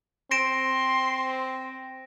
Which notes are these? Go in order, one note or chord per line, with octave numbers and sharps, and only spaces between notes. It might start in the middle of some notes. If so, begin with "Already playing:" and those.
C4 C6 A#6 D7 E7